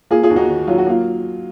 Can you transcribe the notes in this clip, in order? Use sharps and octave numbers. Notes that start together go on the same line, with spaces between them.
A#3 F4 G#4
F4 G#4
D#2
D#4 F#4
D#3
F#3 F4
F#4
A#3 F4